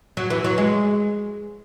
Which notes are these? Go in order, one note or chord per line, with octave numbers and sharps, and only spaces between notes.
F#3
E3
F#3
G#3